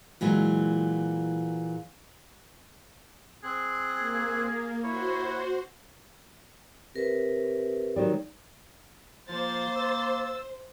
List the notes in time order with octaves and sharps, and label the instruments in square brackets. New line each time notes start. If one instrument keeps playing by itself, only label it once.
[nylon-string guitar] A#2 E3 F#3 G#3
[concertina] C4 F#6 [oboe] G#4
[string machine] A#3
[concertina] E4 C#5 [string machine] F#4 C5
[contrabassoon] C3 [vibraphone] A#4 B4
[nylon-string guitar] D#3 F#3 G3
[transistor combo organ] F3 [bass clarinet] A#3 [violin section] C5 [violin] A6
[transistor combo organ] E6